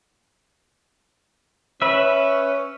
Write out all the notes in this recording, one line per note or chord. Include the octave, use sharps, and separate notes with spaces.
C#4 B4 E5